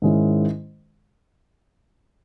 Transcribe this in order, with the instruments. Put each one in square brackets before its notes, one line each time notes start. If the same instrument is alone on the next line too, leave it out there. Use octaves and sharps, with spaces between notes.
[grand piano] G#2 D#3 G#3 C#4 E4